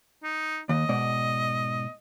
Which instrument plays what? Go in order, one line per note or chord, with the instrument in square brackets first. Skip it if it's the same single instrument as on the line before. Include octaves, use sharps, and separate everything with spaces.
[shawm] D#4
[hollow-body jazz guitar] D#2 [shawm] D#5
[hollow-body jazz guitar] G#2 B2 D5